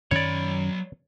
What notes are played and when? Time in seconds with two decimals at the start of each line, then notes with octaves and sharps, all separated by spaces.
0.11 F#2 D#3 F#3 C#4 C#5 D5 B5